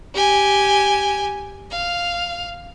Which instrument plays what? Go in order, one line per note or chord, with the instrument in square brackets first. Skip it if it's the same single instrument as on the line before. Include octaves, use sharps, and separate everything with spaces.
[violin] G4 G#5
F5